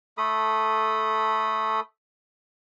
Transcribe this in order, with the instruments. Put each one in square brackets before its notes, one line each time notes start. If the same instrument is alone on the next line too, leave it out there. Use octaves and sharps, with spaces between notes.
[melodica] A3 A4 B5 D#6